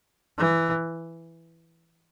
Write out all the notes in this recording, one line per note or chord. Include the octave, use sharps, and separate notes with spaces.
E3